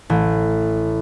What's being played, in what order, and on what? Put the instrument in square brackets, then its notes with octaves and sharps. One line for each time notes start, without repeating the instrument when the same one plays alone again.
[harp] A1